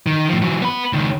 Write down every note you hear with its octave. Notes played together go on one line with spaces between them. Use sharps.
D#3
A2 F3
E3 F#3
B3 B5
C#2 D#3